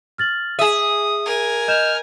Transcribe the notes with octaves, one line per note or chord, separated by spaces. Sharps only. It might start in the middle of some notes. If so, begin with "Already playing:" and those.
F6 A6 F#7
G#4 E5 D#6 D#7
A#4 G#5
D#5 F6 G6 E7